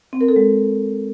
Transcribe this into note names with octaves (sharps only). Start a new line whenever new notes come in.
C4
A#4
A4
G#3